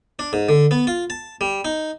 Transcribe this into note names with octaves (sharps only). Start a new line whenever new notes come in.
D4
G#2
D3
B3
F4
A5
G3
D#4